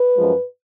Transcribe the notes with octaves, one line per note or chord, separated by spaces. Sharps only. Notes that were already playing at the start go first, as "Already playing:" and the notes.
Already playing: B4
F#2 F3 G#3